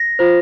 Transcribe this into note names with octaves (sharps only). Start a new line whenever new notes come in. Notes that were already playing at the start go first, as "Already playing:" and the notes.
Already playing: A#6
F4 C5